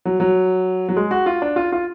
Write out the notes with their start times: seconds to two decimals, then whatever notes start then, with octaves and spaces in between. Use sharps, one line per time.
0.05 F#3
0.20 F#3
0.89 F#3
0.97 G#3
1.11 F#4
1.26 F4
1.42 D4
1.56 F4
1.72 F4